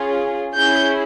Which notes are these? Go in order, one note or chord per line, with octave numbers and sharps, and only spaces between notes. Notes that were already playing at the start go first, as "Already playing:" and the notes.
Already playing: C#4 F4 G#4
C#4 E4 G#4 G6